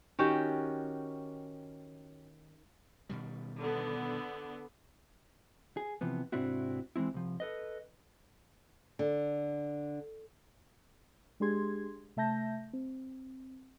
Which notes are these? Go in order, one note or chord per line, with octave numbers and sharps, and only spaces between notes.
D#3 C#4 F#4 G4
B2 D#3 G3
D3 B3
G#4
C3 E3 F3 B3
G#2 C3 C4 D4 E4 F#4
E3 G#3 C4 E4
C2 F3
A4 B4 D#5
D3
G#3 D4 G4 G#4 C6 G#6
C3 A3 E5 A5 G6 A#6
C4